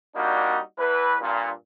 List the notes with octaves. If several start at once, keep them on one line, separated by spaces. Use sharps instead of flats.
G3 A#3 D4 D#4 F#4
E2 E3 B4
G2 A#2